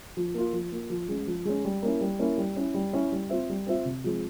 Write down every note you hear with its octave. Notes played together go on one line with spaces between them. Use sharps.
F3
A#3 F4
F3
A#3 F4
F3
G#3 C#4
F3
G#3 C#4
G3
A#3 C#4 E4
G3
A#3 C#4 E4
G3
C#4 E4
G3
C#4 E4
G3
C4 F4 C5 E5
G3
C4 F4 C5 E5
C3
F3 G#3 C4